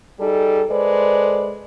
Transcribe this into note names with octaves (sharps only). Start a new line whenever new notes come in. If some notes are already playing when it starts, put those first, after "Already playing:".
G3 D#4 G#4 A4
G#3 A4 B4 C5 D5